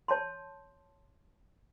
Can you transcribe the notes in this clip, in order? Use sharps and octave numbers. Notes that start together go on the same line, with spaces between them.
C#5 A5 C6